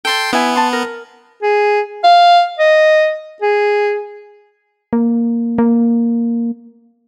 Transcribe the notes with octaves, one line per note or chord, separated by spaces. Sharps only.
A4 G5 A5 C6
B3 E4 E5 G#5
A5 C6
A#4
G#4
F5
D#5
G#4
A#3
A#3